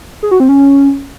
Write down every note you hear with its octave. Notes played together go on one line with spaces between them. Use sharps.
G#4
F#4
C4
C#4